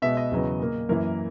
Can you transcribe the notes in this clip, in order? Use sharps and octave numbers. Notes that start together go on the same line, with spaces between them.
B2 G#3 B3 E5
D#5
E2 C#3 F#3 B3
A#2 A#3
F#2 E3 A#3 A#4